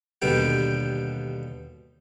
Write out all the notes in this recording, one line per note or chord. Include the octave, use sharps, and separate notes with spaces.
D#2 B2 D3 G3 G5